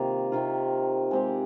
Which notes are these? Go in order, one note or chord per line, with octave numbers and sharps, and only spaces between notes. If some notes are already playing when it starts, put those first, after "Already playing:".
Already playing: C3 D#3 A#3 F4
C3 D#3 A#3 F4
G#3 C4 G4